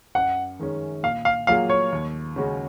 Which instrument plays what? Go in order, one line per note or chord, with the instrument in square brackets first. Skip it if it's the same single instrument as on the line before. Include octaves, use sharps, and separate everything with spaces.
[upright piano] F#2 [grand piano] F#5
[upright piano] D#3 G#3 C#4
[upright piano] A#2 [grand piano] F5
[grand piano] F5
[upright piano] F#3 A#3 F4 G#4 [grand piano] F5
[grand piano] C#5
[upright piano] D#2
C#3 G#3 C#4 F#4